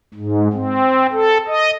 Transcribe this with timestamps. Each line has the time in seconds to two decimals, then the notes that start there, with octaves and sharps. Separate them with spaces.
0.14 G#2
0.53 C4
1.12 A4
1.48 D#5